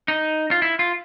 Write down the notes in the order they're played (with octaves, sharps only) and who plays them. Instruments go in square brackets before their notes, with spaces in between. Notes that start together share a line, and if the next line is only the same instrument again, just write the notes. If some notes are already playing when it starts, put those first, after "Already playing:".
[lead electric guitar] D#4
F4
E4
F4